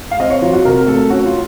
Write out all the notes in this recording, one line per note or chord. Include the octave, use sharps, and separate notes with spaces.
F5
C4 D#5
C#5
F#3 F4
F#4
C3 A#4
A3 A4
C#4 F#4
F4